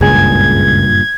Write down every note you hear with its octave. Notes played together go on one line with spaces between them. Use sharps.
F#1 C#2 G2 A#2 G#4 G#6